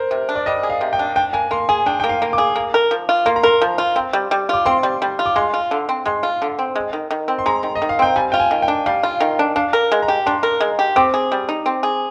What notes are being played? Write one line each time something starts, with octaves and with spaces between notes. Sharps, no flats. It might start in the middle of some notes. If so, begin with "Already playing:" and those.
Already playing: A#4 C5
C3
D4
D5
G3 D#5
G#4
F5
C3
G5
D4
D4 G5
A#3 G#5
A#3 C6
G#4 G#5
D4 G5
A#3 G5
F5
A#3
D6
G#4
A#3
A#4
F3
F4
A#3 C6
A#5
A#4 C6
F3
F4
C4
G3
G3
F4 D6
C4 C6
G3
G3
F4
D6
G#3 C6
F4
D3
C4
G#3 C6
F4
D3
C4
G#3
D#3
D#3
C4
C6
G#3 A#5
D#3
D#5
D#3
F5
C4 G5
G3 G#5
F4 G5
G#5
D#3
G5
D4
G3 F5
F4
D#3
D4
D4 F5
A#4
G#3
A#5
G4
D4 C6
A#4
G#3
G4
C4 D6
G#4
G3
D#4
C4
G#4